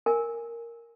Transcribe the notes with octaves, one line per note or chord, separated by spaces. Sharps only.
A#4 G#5